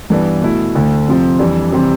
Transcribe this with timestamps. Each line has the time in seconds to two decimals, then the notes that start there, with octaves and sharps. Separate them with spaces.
0.10 G2 E3 B3 D4
0.42 B2 A3 E4
0.75 D2 D3 A3
1.08 F2 C3 F3 C4
1.39 F2 E3 G3 D4
1.72 C3 E3 G3 C4